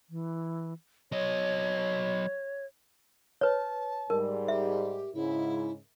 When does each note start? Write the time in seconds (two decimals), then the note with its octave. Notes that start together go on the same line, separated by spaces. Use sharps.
0.10 E3
1.12 F#3 C#5 D#5
3.41 B4 C#5 A5
4.10 G#2 G3 A#4
4.48 G4 E5
5.14 G#2 C#3 E4